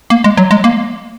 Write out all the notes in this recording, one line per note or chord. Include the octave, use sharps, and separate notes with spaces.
A#3
G#3
F#3
G#3
A#3